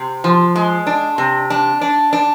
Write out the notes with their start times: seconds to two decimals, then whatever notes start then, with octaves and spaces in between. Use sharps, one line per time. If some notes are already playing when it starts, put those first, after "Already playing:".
Already playing: C3
0.24 F3
0.55 G#3
0.87 D4
1.18 C3
1.50 D4
1.81 D4
2.13 D4